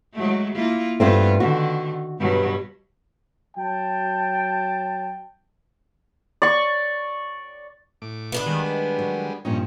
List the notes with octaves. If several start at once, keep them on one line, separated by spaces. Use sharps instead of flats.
F#3 G#3 A3
A#3 E4 F4
G2 A3 B3 C4 F4
D3 D#3 F#4
G2 B2 F#3
F#3 G5 A5
D5 C#6
A2 D6
B2 B3 D4 B4
D#3 G3 G#3
F#3
G2 A#2 F3 C#4 D#4